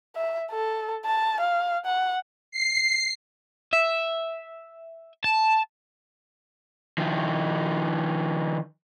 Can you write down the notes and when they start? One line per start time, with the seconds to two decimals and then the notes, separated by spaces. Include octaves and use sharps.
0.16 E5
0.51 A4
1.05 A5
1.40 F5
1.85 F#5
2.51 C7
3.73 E5
5.24 A5
6.98 D#3 F3